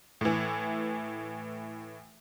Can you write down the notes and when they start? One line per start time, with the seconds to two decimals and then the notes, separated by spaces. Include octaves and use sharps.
0.21 A2 E3